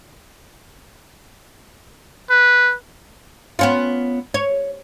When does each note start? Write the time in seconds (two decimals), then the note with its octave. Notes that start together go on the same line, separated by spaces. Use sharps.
2.30 B4
3.59 B3 C#4 F4
4.34 C#5